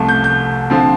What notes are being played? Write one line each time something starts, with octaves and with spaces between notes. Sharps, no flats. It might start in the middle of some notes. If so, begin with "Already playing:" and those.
Already playing: C2 C3 F3 A3
G6
G6
D3 F3 C4